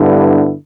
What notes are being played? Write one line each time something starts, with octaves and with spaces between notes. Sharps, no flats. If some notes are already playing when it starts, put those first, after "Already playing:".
Already playing: G2 D3 B3 E4